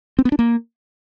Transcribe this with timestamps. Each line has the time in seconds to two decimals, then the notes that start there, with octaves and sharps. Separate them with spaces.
0.19 C4
0.25 B3
0.32 D4
0.39 A#3